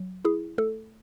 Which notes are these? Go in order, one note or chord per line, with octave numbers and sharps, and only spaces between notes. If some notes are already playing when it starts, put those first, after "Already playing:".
Already playing: F#3
E4 G#4
A3 A4